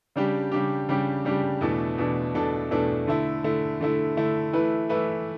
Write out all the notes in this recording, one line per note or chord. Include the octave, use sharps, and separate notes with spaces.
C#3 G3 D4 G4
C#3 G3 D4 G4
C#3 G3 D4 G4
C#3 G3 D4 G4
E2 B2 A3 D4 A4
E2 B2 A3 D4 A4
E2 B2 A3 D4 A4
E2 B2 A3 D4 A4
D3 A3 E4
D3 A3 E4
D3 A3 E4
D3 A3 E4
E3 A3 E4 B4
E3 A3 E4 B4